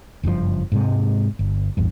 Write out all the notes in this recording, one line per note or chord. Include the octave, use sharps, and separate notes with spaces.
F#1 G2 A#2 F3
G#2 C3 G#3
G1
A1 E2 G2